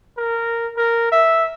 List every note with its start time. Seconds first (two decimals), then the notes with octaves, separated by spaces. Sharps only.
0.17 A#4
0.77 A#4
1.12 E5